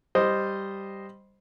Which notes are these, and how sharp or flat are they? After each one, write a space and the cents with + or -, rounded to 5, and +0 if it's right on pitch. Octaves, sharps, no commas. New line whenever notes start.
G3 +0 C5 +0 D#5 -5